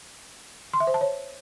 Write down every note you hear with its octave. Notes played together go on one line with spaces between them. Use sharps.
C6
E5
C5
A5
C#5